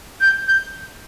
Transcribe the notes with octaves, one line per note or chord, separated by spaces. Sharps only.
G6
G6